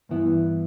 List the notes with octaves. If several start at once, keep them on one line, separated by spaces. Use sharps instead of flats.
G2 E3 B3 E4